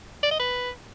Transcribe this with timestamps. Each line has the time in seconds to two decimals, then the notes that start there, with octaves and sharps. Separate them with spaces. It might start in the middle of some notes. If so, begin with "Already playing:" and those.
0.23 D5
0.31 D#5
0.39 B4